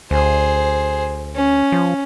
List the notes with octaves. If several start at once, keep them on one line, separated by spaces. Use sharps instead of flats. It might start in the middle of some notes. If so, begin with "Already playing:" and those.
D2 G#4 C5
C#4
F3